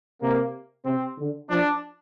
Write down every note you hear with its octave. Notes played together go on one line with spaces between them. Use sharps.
C3 A#3
C3 C4
D3
F3 D4